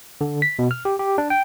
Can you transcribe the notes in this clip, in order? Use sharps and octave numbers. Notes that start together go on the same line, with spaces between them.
D3
B6
B2
F6
G4
G4
D4
G5